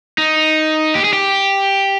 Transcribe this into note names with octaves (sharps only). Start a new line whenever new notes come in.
D#4
G4
G#4
G4